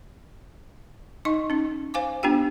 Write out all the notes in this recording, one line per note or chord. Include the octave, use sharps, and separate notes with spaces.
D#4 D#5 C#6
C#4 D#4
C5 F5 G#5 D6
B3 D4 F4 G4 G5